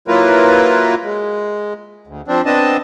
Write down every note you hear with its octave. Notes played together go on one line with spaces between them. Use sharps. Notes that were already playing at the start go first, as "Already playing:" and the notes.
F#3 A#3 E4 F4 A#4 B4
G#3
D2
F3 C4 D4
B3 C4 D4 D#5 A5